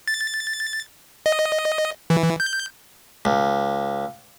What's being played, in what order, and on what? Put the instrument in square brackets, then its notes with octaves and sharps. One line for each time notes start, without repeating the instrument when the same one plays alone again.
[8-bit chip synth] A6
D#5
E3
G6
[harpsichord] C#2